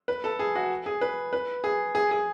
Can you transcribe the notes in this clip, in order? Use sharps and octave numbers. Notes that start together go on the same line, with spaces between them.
B4
A4
G#4
F#4
G#4
B4
B4
G#4
G#4
G#4